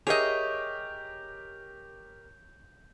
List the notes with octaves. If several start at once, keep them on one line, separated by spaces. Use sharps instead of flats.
G4 G#4 A#4 C#5 D#5 E5 G6 F7